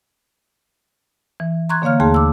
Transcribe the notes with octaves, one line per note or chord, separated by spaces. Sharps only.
E3
A#5 C6 C#6 F#6 G#6
D3 A#3 C#5 F5 F6
D#2 A3 G#4 A5 C6
D6 E6